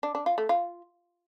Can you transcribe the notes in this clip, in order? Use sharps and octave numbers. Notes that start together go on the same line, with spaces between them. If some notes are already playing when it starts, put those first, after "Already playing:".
D4
D4
F4
A3
F4